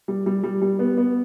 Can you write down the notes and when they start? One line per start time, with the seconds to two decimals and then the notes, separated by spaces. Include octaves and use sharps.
0.08 G3
0.26 G3
0.43 G3
0.62 G3
0.79 B3
0.97 B3